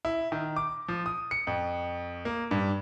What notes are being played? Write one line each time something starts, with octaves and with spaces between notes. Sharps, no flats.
E4
D#3
D6
F3
D#6
C#7
F2
A#3
G2